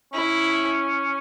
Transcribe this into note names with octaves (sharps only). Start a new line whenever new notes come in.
C#4 E4